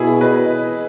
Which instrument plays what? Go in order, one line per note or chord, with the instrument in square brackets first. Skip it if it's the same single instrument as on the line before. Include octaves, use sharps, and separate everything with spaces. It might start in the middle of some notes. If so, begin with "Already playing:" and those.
Already playing: [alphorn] B2 [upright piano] E4 G#4
[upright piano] B4 D#5